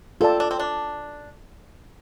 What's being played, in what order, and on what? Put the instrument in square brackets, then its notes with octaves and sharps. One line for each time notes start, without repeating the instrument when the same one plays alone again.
[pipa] C4 [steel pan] F4 A4 D5 A5
[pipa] D4
C4
D4